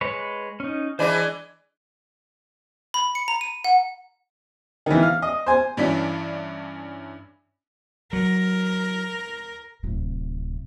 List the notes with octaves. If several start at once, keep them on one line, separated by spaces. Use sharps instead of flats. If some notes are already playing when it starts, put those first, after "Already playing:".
G#3 B4 C#5
C#4 D#4
E3 G#3 D4 C5 B5 D6
B5
C#7
A#5
D#7
F#5
D#3 E3
F5
D#5
C5 G#5
G2 E3 C#4 D4 B6
F#3 A#4
D1 C3